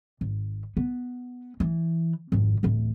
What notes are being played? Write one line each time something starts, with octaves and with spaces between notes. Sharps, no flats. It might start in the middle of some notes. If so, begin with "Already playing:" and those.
G#1
B3
E3
G#1 F2
D1 A1